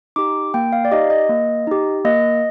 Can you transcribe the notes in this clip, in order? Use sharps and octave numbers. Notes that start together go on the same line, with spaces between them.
D#4 G4 D6
A#3 G5
F5
D5
D#4 G4 D#5
D#5
A#3
D#4 G4
A#3 D#5